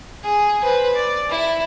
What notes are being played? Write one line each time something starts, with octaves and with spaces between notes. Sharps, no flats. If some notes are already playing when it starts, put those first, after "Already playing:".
G#4
B4 C5
D5
E4